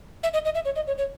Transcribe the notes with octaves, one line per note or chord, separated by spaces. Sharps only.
E5
D#5
D#5
E5
C#5
D#5
C#5
C#5